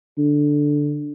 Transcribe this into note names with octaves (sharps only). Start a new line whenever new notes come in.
D3